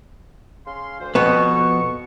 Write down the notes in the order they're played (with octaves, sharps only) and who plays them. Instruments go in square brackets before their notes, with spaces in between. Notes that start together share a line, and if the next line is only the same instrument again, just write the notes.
[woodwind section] C#3 F5 C6
D2 E3 C5
[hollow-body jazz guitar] F2 B2 B3 [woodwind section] C#6